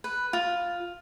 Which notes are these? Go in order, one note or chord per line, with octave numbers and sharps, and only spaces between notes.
B4
F4